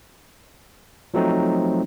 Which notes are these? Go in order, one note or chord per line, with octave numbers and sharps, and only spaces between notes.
F3 F#3 A3 C4 D#4